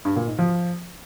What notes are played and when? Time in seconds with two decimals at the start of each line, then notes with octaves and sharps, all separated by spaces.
0.05 G2
0.16 A#2
0.27 G#2
0.38 F3